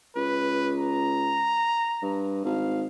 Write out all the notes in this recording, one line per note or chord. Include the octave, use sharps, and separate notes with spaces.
C#2 B4
A#5
G2
G#1 F5